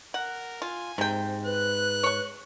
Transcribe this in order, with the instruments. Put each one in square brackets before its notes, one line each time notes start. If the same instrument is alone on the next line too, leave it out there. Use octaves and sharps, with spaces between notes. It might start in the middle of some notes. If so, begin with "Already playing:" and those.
[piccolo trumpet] A#4 [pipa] F#5
[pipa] F4 [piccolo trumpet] G#5
[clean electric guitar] G#2 [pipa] C3 G5
[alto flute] B4 [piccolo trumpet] F#6
[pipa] C#5 C#6